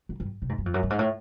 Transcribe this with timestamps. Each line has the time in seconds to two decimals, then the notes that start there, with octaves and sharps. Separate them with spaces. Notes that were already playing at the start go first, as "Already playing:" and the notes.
0.09 F#2
0.20 G2
0.42 C3
0.49 G#2
0.58 F#2
0.66 F2
0.74 F#2
0.83 G2
0.90 G#2
0.99 A2